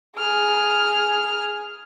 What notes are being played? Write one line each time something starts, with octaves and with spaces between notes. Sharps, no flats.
G#4 F6